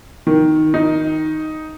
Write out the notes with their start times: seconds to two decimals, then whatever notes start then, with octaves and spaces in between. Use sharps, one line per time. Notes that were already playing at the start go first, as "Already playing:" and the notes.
0.27 D#3
0.74 D#4